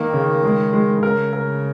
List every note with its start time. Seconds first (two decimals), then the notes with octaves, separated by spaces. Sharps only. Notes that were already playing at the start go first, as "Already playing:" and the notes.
Already playing: D#3 A#3
0.13 C#3
0.44 G#3
0.73 G#3
1.02 C#3 A#4
1.33 A#4